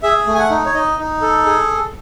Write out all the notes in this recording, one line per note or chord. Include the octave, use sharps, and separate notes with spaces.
G#4 E5
A3
G#5
F#5
D#4
C#5
D#4 D#5
D#4
A4
G#4